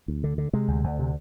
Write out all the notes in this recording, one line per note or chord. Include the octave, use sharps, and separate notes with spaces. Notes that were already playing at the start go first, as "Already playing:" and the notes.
D2
D3
D3
C3 G#3
D2
D2
C3